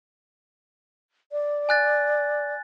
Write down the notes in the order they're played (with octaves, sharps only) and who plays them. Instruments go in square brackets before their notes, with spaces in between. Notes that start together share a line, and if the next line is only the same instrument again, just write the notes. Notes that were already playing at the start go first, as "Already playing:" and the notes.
[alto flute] D5
[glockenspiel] G#5 F#6 A6